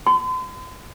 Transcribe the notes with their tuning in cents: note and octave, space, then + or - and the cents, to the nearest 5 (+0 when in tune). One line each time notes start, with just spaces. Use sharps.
C6 -45